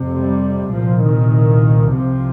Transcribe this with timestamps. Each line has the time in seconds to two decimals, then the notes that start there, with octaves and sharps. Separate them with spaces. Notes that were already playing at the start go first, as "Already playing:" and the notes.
Already playing: F2 C3
0.12 G3
0.72 C2 A#2 F3
1.03 D#3
1.92 C2 C3 F3